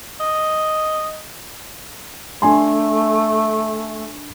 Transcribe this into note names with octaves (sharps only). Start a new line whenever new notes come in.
D#5
A3 D4 G#5 C6